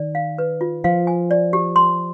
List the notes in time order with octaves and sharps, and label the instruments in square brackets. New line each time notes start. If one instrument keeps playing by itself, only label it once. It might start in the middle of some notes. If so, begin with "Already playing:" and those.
Already playing: [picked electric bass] D#3 [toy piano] D5
[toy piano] F5
B4
F4
[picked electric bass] F3 [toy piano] F5
[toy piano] G#5
D5
G4
C6